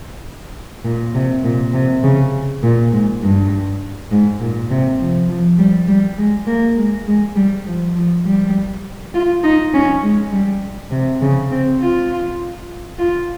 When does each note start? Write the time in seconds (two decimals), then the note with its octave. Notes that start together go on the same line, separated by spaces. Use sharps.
0.84 A#2
1.14 C3
1.44 A#2
1.73 C3
2.03 C#3
2.63 A#2
2.92 G#2
3.22 G2
4.11 G#2
4.40 A#2
4.70 C3
5.00 F3
5.29 F3
5.58 G3
5.88 G3
6.18 G#3
6.47 A#3
6.78 G#3
7.07 G#3
7.36 G3
7.66 F3
7.95 F3
8.25 G3
9.14 F4
9.43 D#4
9.74 C#4
10.03 G#3
10.32 G3
10.91 C3
11.22 C#3
11.51 C4
11.81 F4
12.98 F4